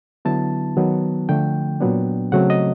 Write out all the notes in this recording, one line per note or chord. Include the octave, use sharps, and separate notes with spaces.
D3 F#3 B3 E4 A5
D#3 F#3 B3
D3 F3 A3 G5
A#2 F#3 B3 D4
C#3 F#3 A3 C4 F#5
D#5